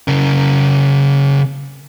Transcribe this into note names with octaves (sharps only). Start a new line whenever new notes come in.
C#3 A#4